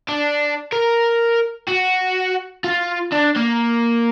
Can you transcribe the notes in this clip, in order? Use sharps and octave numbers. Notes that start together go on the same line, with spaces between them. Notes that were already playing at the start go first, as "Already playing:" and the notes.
D4
A#4
F#4
F4
D4
A#3